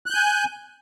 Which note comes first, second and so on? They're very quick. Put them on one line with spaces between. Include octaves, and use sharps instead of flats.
F#6 G6 G#5